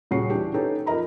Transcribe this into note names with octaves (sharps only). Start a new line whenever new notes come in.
D#1 C#3 F#4 C#6 C7
E3 D4 G4
C#4 D#4 G4 A4 B4
F2 A#4 D#5 A#5 B5